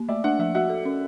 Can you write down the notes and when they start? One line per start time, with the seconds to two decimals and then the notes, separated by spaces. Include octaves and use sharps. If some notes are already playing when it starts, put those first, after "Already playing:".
Already playing: A#3
0.08 A3 D5 E5
0.24 D4 E5 F#5
0.39 F3 E5 F#5
0.55 F#4 E5 F#5
0.69 A4
0.85 C#4